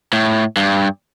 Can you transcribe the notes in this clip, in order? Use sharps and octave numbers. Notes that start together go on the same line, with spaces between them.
A2
G2